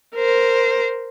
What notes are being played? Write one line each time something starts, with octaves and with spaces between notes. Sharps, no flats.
A#4 C5